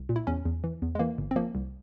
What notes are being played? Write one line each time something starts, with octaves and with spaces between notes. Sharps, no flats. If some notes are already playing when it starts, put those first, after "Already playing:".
Already playing: C2
A#2
E4
E2 C#4
E2
E3
E2
G#3
E3 A#3
G1
C4
F3 A#3
C2